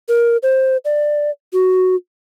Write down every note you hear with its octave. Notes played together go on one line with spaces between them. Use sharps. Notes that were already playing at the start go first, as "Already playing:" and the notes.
A#4
C5
D5
F#4